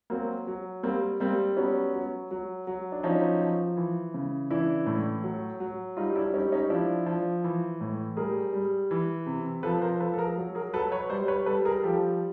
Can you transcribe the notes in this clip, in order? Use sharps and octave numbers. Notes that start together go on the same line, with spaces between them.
F#3 A#3 C4
F#3
G3 A#3 C4
G3 A#3 C4
F#3 B3 C#4
F#3
F#3
F#3
D4
F3 C#4 D#4
F3
E3
C#3
E3 D4 E4
A2
F#3
F#3
G3 D#4 F4
D4 E4
G3 C#4 D#4
C#4 D#4
F3 D4 E4
F3
E3
A2
G3 G#4 A#4
G3
E3
C3
F3 A4 B4
A#4 C5
F3 A4 B4
A4
G#4 A#4
F#3
G#4 A#4
F#3 A4 B4
B4 C#5
G3 C5 D5
B4 C#5
G3 A4 B4
G#4 A#4
F3 G4 A4